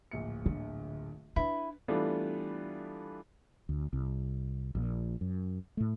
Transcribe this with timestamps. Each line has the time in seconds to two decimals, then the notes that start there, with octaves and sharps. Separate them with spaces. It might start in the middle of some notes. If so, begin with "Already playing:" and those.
0.11 D1 A#1 C#7
0.46 D3
1.36 D4 E4 B4
1.88 E3 G3 A3 B3 D4 F4
3.69 D2
3.93 C2
4.75 A#1 A#2
5.21 F#2
5.77 A2 A3